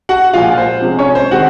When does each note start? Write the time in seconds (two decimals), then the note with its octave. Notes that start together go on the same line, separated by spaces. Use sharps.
0.09 F#4 F#5
0.33 A#2 F3 G#3 F4 F5
0.58 C5
0.82 C3 F3 G#3 C#4
0.99 C#4 C#5
1.15 C5
1.31 D#3 G#3 C4 F#4 F#5